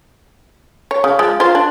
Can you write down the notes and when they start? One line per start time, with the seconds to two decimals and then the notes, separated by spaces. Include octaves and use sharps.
0.91 C#5
1.04 C#3
1.19 F3 G#3
1.40 F4 C5
1.55 D4